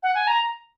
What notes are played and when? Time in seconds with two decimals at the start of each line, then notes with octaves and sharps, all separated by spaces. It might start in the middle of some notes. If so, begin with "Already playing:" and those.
0.03 F#5
0.15 G#5
0.27 A#5